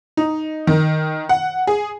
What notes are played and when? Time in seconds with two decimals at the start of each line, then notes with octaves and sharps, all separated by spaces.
0.17 D#4
0.67 D#3
1.29 F#5
1.67 G#4